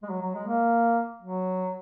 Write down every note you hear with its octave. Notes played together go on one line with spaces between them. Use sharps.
G#3
F#3
F#3
G#3
A#3
F#3